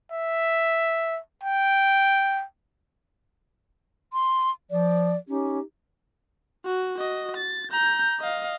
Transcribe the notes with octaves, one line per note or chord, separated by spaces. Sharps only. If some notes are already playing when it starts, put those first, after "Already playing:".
E5
G5
C6
F3 D5
C#4 D#4 G4
F#4
F#4 D#5
A6
A#5 G6
D#5 F5